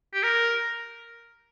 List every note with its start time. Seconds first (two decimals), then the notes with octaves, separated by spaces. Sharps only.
0.14 G4
0.23 A#4